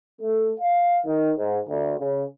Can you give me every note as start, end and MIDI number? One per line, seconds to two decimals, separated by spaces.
0.21 0.51 57
0.59 0.99 77
1.06 1.33 51
1.38 1.59 44
1.69 1.94 38
1.99 2.24 49